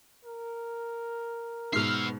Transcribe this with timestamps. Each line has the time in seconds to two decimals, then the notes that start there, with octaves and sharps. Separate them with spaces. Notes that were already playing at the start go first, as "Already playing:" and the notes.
0.25 A#4
1.73 G#2 B2 B3 E5 F6 C7